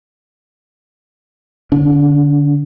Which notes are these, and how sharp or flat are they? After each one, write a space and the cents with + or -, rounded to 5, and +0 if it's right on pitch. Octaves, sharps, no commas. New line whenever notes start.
D3 +0 D4 -40